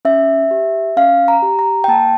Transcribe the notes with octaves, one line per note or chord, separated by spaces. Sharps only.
C#4 E5
G4
C#4 F5
A#5
G4
A#5
G5
A#3 A5